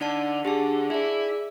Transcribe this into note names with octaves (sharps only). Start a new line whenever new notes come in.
D3 D#4 D5 A5
D3 G4 G#4 A5
E4 G#4 D5